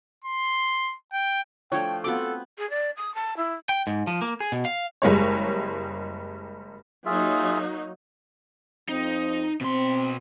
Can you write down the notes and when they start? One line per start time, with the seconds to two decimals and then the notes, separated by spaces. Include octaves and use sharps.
0.24 C6
1.13 G5
1.72 F3 A3 D4 C#5 G5
2.04 B3 C4 F4 F#4 A4 D6
2.58 G#4
2.70 D5
2.97 D#6
3.15 A5
3.37 E4
3.69 G5
3.87 G#2
4.07 F3
4.22 A#3
4.40 G#4
4.52 B2
4.65 F5
5.02 F#1 G3 G#3 C#5
7.06 F#3 A#3 D#4 F4 G#4 E5
8.89 F2 C4 D#4
9.61 B2 C4 C6